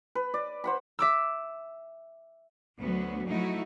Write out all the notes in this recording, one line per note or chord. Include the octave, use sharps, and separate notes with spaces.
B4
D5
C5 F#5 B5
E5 D6 E6
D2 F#3 B3 F#4
F3 F#3 A3 D#4 E4 F#4